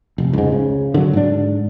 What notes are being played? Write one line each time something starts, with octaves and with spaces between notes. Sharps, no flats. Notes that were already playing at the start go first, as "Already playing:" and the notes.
F1
C#2 G#2
C#3
D3 F#3
G#2 D4